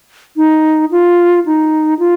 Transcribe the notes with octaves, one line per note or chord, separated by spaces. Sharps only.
D#4
F4
D#4
F4